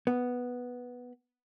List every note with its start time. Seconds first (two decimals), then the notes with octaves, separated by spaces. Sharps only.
0.07 B3